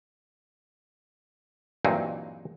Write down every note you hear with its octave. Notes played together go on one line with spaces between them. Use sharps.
G2 A#2 E3 F#3 C4 D#4